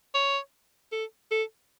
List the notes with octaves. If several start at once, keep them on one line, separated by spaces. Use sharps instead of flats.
C#5
A4
A4